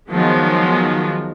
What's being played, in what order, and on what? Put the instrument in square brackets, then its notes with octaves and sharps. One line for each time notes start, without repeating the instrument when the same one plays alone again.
[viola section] D#3 F3 F#3 G#3 B3